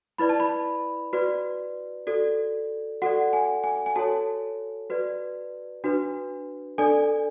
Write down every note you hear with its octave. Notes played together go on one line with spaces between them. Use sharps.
E4 B4 D5 B5
A5
B5
F#4 B4 D5
F#4 A4 D5
F#4 A4 D5 F#5
G#5
G#5
G#5
F#4 A4 C#5 A5
F#4 B4 D5
D4 F#4 B4
D4 A4 D5 G#5